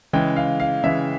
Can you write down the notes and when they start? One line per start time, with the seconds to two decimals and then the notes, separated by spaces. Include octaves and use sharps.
0.13 C#3 E3 G#3 G5
0.36 F5
0.60 F5
0.84 C#3 E3 G#3 E5